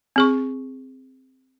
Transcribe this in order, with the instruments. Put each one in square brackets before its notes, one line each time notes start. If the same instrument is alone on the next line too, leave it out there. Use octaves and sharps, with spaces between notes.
[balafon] C4 G#4 C#6